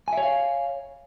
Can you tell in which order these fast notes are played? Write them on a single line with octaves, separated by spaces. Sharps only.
G#5 E5 C#5 F5